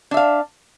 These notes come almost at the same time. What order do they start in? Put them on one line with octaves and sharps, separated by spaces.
D4 E5 F5